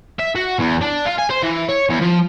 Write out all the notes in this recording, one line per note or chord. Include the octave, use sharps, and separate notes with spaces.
E5
F#4
E2
D4
F4
G#5
C5
E3
C#5
E2
F3